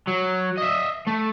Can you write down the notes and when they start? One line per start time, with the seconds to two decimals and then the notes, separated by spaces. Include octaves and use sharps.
0.08 F#3
0.58 D#5 E5
1.07 A3